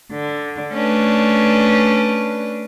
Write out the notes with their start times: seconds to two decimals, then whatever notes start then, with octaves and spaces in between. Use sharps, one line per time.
0.13 D3
0.73 A3 C#4 D4 B4